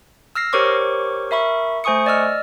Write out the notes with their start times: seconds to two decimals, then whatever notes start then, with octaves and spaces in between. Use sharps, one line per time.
0.35 E6 F6 A#6 C7
0.53 G4 A#4 C5 C#5 C#6 D6
1.31 A#4 E5 B5 C#6
1.84 A3 C5 G#5 C#6 D#6 C#7
2.06 D5 D#5 E6 F6